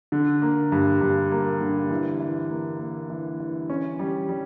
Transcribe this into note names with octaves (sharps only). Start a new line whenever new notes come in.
D3
A#3
G2
G2
A#3
D3
E3
E3
A#3
A#3
E3
E3
C#4
G3
G3